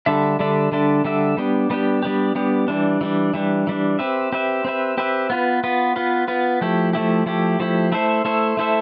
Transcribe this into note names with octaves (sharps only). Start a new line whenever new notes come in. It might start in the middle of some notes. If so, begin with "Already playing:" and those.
D3 G3 D4 A4 E5
D3 G3 D4 A4 E5
D3 G3 D4 A4 E5
D3 G3 D4 A4 E5
G3 B3 D4 G4
G3 B3 D4 G4
G3 B3 D4 G4
G3 B3 D4 G4
E3 G3 D4
E3 G3 D4
E3 G3 D4
E3 G3 D4
C4 G4 B4 E5
C4 G4 B4 E5
C4 G4 B4 E5
C4 G4 B4 E5
B3 F4 B4
B3 F4 B4
B3 F4 B4
B3 F4 B4
F3 A3 E4 G4
F3 A3 E4 G4
F3 A3 E4 G4
F3 A3 E4 G4
A3 E4 A4 C5 E5
A3 E4 A4 C5 E5
A3 E4 A4 C5 E5